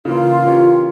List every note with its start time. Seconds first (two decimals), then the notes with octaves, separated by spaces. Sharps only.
0.05 C#3 E3 A#3 F4
0.44 E3 A#3 C#4 G4